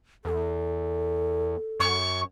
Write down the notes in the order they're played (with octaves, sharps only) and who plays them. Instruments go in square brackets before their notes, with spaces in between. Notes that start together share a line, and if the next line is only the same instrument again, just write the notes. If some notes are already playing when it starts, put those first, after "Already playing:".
[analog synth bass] E2 [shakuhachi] A4
[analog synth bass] F#2 [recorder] C#6